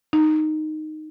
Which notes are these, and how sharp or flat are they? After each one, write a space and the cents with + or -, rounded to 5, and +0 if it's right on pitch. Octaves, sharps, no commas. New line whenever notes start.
D#4 -10